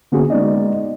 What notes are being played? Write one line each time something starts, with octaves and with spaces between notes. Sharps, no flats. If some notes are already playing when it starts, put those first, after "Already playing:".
D3 A#3 B3 C#4 F#4 G#4
G#3 B3 D#4 D5 D#5